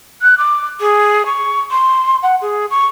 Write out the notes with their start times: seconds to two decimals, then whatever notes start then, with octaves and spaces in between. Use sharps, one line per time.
0.22 F#6
0.38 D6
0.81 G#4
1.26 C#6
1.71 C6
2.23 F#5
2.41 G#4
2.71 C#6